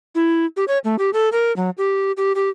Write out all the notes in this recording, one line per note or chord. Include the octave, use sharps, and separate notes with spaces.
E4
G4
C#5
A3
G4
A4
A#4
F#3
G4
G4
G4